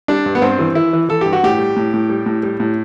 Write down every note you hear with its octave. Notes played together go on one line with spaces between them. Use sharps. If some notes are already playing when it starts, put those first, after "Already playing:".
G3 D4
G2
B3
G2 C4
E3
E3 E4
E3
E3 A4
G2 G4
F#4
A2 G4
G3
A2
A2
G3
A2
G3
A2